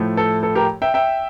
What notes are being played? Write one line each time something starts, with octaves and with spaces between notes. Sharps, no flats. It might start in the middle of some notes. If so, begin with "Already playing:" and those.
Already playing: A2 F3 A3
A4
A4
G4 A#4
E5 G5
E5 G5